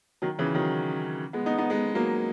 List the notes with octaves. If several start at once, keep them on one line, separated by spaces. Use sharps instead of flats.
D#3 F#3
C#3 E3
D#3 F#3
G#3 B3
B3 D#4
B3 D#4
G#3 B3
F#3 A#3